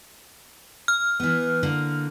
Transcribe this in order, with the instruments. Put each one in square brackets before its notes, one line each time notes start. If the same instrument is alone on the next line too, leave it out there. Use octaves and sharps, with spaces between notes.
[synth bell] F6
[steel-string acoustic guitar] E3 B3
D3 A#3